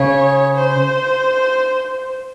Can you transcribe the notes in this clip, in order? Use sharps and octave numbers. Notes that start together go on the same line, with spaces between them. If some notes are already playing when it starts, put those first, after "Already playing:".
Already playing: C#3 C#5
C5